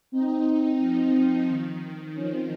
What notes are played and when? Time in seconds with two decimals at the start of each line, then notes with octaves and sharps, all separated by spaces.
0.12 C4 D#4
0.79 F3
1.48 D#3
2.15 F3 C#4
2.33 C4